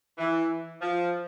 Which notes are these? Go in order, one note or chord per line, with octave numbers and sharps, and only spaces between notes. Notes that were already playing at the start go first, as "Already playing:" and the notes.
E3
F3